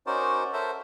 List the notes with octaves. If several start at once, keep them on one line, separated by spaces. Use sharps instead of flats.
C#4 D#4 F#4 A#4 C5 D5
A4 A#4 C5 E5